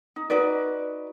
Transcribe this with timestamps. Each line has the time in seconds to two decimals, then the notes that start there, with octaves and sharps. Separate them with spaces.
0.16 D#4
0.30 D#4 F#4 B4 D5